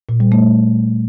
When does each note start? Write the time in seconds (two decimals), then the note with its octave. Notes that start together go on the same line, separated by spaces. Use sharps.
0.09 A#2
0.20 G3
0.32 A3